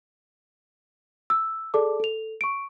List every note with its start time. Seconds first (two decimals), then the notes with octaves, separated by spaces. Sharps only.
1.30 E6
1.74 G#4 A4 D5 A5 D6
2.00 A4 F7
2.41 C#6 D7